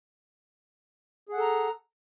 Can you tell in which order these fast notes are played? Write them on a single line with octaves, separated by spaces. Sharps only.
G#4 F#5 A4 A#5